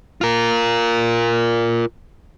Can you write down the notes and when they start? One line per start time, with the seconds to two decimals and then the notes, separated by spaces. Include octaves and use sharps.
0.21 F4 A#4